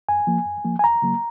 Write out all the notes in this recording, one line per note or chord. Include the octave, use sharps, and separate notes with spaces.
F#2 G#5
F3 A#3
F#2
F3 A#3
G#5
D#2 A#5
C#3 F#3 A#3